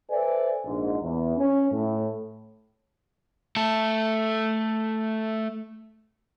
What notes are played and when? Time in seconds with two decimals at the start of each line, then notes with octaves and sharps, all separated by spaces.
0.10 A4 B4 C5 D5 E5 G#5
0.65 A#1 G#2
1.01 E2
1.37 C#4
1.71 A2
3.57 A3 A4